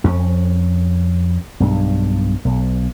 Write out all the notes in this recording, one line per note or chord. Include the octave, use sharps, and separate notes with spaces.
F2 C#4
B1 G2
B1